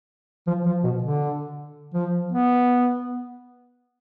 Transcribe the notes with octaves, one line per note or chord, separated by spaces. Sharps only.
F3
F3
B2
D3
F3
B3